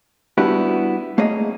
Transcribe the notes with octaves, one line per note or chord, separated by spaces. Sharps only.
G3 B3 D4 E4 F#4 G4
A3 A#3 G#4 C#5 D#5